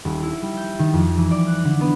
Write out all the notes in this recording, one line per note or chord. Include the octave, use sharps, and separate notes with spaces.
D#1
E4
G3
G6
D#3
F2
E3
D5
F#6
D3
B3